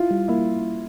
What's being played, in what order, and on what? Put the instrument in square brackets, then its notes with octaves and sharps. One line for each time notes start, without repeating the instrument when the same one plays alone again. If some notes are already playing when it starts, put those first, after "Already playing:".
Already playing: [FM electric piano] E4 [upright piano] F4
[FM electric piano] G3
[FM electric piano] A#3 [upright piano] E4